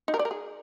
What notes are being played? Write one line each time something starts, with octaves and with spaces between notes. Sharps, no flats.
D#4
A#4
D5
A#4
G#4